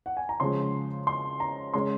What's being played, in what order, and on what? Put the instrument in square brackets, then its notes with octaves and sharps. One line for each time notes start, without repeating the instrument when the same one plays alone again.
[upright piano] F#5
G#5
A#5
C#3 F3 G#3 C6
C6
A#5
C#3 G#3 C#4 C6